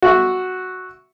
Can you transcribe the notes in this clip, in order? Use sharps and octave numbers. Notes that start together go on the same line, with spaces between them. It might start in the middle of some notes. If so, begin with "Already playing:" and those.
F#4 E5 F#5